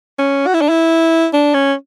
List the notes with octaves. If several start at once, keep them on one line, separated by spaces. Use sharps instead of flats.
C#4
F#4
E4
D4
E4
D4
C#4